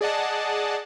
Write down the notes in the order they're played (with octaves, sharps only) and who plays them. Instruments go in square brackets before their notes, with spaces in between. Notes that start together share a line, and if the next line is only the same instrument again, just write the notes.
[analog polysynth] G#4 D5 D#5 F#5 A5